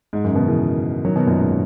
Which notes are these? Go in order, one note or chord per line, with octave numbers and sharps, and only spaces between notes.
G#2
F#2
C#3
B2 D#3
C#3 E3
D#3 F#3
B2 D#3
F#2 A#2
G#2